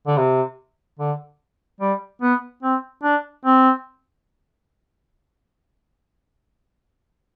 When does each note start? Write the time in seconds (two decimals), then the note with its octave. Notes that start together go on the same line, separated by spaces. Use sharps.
0.07 D3
0.17 C3
0.99 D3
1.80 G3
2.22 B3
2.63 C4
3.03 D4
3.45 C4